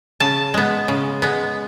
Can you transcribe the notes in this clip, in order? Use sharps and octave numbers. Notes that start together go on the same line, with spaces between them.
C#3 A5
G#3 B3
C#3
G#3 B3